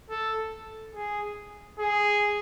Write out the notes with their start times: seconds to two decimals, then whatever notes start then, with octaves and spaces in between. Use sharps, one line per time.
0.10 A4
0.95 G#4
1.80 G#4